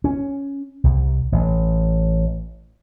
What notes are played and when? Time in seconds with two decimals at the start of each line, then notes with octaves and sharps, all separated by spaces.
0.04 C#4
0.84 C2
1.32 A1